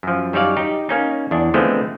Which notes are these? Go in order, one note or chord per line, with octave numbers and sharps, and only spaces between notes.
F#2 F3
F#2 G3 D#4 C#5 D5 F5
D#4 G4
A#3 C#4 D#4
E2 D4
D3 F3 G#3 A3 B3 C4